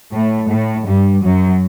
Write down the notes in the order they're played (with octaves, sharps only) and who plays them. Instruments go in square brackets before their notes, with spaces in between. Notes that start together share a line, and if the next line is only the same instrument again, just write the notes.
[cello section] A2 A3
A2 A3
G2 G3
F#2 F#3